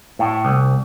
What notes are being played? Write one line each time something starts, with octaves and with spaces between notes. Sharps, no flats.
A2
C2